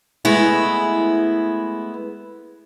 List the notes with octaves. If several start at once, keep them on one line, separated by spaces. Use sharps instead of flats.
G#3 A3 B3 E4